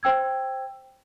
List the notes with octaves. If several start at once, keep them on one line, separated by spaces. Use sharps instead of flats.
C5 G5 E6 G#6